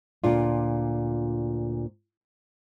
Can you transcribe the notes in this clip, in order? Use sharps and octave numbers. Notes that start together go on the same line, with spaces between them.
D2 A#2 D4 F4